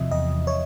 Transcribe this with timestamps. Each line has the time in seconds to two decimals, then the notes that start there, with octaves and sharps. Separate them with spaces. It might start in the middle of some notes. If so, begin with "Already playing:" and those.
Already playing: E2 C3 F3 D#5 E5
0.11 E2 D#5
0.47 C#5